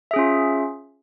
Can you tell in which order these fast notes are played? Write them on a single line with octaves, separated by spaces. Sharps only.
E5 G#4 C#4 F4